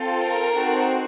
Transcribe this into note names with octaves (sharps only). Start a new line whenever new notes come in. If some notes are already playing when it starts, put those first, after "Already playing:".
Already playing: C4 F4 A4
A#4
C4 D#4 F#4 A4